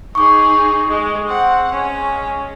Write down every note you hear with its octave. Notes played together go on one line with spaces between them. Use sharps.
D#4 G#4 C#6 D6
G#3 D#5
C4 F#5
G#3 C#4